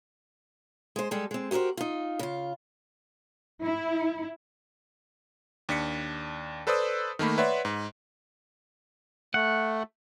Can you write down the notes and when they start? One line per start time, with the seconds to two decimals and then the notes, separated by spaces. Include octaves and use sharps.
0.96 G#3 C5
1.11 G3 G#3 G4 A4
1.31 G#3 C4
1.51 F#4 G4 A4 A#4 C5
1.77 D#4 F4
2.19 C#3 F4
3.62 E4
5.69 D#2 D4 B6 C#7
6.67 A4 B4 C5 D5 D#6 E6
7.19 D#3 A3 A#3 B5
7.38 B4 C#5 D5 E5 F#5 C6
7.65 G#2
9.34 A3 F#5